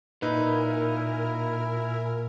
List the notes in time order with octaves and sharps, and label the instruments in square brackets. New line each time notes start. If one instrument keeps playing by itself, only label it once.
[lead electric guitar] A#2 [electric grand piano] D#4 B4 [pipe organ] E4 [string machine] A#4 G#5 F6